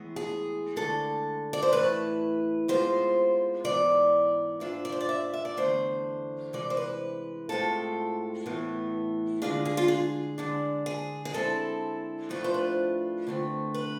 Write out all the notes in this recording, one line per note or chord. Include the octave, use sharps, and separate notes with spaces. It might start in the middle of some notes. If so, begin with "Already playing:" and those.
Already playing: A2 E3 G#3 B3
G#4
D2 D3 G#3 A4
D5
C5
A2 E3 A3 E4 B4
C3 G#3 B3 F4 C5
G#2 E3 B3 D5
G#2 G#3 D4 F4 E5
D5
C5
D5
E5
E5
D5
E2 D3 A3 C5
C3 E3 G#3 D5
C5
B4
A2 G#3 C4 F4 A4
A2 E3 B3
D3 G#3 D4 F4 G#4
G#4
F4
G#4
D3 G#3 D4
G#4
G#4
D3 G#3 C4 E4 A4
A2 F3 A3 D4 F4 B4
C5
B4
D3 A3 C4
B4